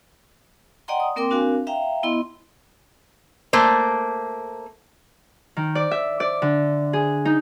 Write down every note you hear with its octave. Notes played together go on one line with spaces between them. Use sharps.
D5 D#5 F#5 G5 A#5 C6
D#6
A#3 C4 A#4 G5 C6 D6
C4 D4 F#4 A#4 F5 G#5
E5 F5 G5 A#5
B3 E4 D#5 C6
A3 A#3 C5
D#3
D5
E5
D5
D3
G#4
D#4